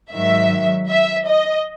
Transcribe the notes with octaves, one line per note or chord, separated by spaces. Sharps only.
G#2 D#3 F#3 E5
E5
D#5